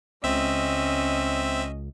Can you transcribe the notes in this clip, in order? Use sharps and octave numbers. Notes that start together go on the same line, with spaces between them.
C#2 C4 C#4 D#5 E5